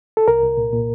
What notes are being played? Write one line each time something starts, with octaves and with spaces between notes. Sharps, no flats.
A4
C2 A#4
C2
A#2
A#2